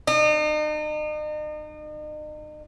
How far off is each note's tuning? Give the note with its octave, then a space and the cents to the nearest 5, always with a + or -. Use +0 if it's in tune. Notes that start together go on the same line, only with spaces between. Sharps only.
D#4 -40